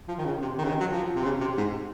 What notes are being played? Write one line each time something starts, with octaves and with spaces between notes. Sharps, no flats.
F3
D#3
C#3
C3
D#3
C#3
D#3
F#3
F3
C3
C#3
C3
G#2